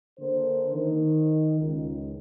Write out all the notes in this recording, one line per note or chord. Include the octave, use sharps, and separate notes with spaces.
D3 A#3 A#4 C5
D#3
C#2